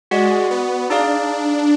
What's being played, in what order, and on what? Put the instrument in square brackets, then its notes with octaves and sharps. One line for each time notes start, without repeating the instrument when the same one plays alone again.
[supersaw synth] G#3 [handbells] F#4 D5 F#5
[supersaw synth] B3
[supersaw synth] D4 [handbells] D#4 G#4 D5 F5